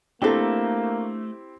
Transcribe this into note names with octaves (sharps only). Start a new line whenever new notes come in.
A3 A#3 C4 D4 E4 G4 A4 A#4